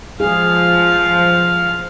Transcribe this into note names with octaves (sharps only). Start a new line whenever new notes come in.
F3 G#4 F5